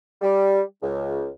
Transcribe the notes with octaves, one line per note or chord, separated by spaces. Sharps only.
G3
C#2